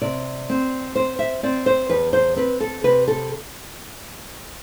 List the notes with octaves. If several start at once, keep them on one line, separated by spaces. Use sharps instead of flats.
C3 D5
C4
C4 C5
E5
C4 D5
C5
E2 B4
C5
C4 B4
A4
C3 B4
A4